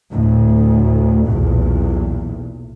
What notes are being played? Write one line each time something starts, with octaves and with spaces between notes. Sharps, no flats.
D2 A2
B1 E2 A#2